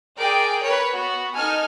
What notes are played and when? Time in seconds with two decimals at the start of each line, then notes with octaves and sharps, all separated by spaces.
0.18 G#4 A#4 D5 G5
0.64 A#4 B4 C#5
0.94 B3 F#4
1.33 D#4 A4 G#5 F6